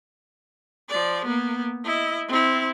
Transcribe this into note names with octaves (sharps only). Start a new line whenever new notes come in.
F3 D5
A#3 B3
E4 D#5
C4 E4